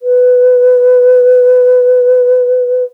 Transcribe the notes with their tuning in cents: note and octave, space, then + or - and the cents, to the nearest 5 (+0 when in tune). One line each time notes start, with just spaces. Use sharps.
B4 +15